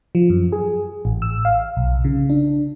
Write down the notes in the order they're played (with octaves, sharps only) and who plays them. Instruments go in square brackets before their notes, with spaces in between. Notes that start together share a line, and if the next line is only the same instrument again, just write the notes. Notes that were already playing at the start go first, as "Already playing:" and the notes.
[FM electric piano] F3
F#2
G#4
A1
E6
F5
B1
C#3
D4